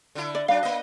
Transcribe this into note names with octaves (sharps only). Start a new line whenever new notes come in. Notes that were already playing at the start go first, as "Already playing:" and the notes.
D3 E4
D5
F#3 D4 F5
A#3 D#5